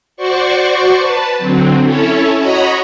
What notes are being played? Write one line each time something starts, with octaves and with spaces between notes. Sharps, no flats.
F#4 C5 D5 C#6
B4 A5
D3 F#3 C4
C#4 E4 A4 C#5
F#4 C#5 D#5 A#5 B5 C#6